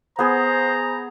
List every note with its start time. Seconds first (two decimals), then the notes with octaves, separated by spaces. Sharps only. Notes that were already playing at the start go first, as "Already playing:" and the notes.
0.19 B3 G#4 C5 A#5